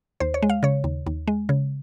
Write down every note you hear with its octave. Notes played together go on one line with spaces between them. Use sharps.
D#2 C5
C#5
G#3
F5
C#3 C#5
D#2
D#2
G#3
C#3